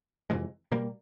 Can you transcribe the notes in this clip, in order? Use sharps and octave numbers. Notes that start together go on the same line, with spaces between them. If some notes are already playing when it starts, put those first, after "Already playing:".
F2 C3 E3 G#3
B2 G3 A#3